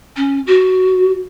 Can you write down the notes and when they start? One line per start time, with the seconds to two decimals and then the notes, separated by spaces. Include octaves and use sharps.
0.16 C#4
0.46 F#4